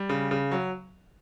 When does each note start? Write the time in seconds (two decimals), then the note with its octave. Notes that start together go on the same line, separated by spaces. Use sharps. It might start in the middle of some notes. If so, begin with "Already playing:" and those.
Already playing: G3
0.09 C#3
0.31 C#3
0.51 F#3